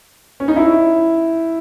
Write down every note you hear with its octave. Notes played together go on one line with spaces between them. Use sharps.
C#4
D#4
E4